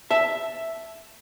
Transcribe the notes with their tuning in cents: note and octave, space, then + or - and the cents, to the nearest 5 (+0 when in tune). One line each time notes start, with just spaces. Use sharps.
E5 +0 A5 +5